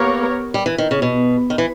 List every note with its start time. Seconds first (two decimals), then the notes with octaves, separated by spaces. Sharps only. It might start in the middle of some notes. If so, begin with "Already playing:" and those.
Already playing: A#3 B3 G4 A#4 C#5
0.54 G3
0.66 E3
0.78 D#3
0.91 C#3
1.02 B2
1.50 D#3
1.58 E3